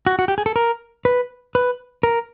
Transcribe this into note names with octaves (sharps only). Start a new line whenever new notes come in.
F#4
F#4
G4
G#4
A4
A#4
B4
B4
A#4